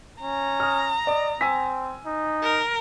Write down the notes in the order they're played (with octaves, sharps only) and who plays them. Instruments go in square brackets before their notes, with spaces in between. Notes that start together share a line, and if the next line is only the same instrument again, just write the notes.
[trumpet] C#4 [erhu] A#5
[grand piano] D#6 F6
[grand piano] D5 [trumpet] D#5
[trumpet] C4 [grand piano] G#5 E6 B6
[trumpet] D#4
[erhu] A#4